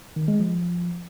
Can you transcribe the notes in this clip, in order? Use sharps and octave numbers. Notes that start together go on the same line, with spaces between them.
D#3
G#3
F3